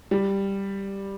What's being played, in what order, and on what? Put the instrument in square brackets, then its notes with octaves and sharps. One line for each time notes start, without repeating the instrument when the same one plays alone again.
[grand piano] G3